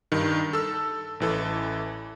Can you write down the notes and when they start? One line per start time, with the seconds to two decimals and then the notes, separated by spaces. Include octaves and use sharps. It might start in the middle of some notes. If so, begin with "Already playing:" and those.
0.12 G2 D#3
0.53 A4 E6
1.20 A1 E3 A4